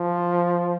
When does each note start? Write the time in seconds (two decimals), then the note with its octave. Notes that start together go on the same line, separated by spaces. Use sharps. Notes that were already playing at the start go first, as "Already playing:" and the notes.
Already playing: F3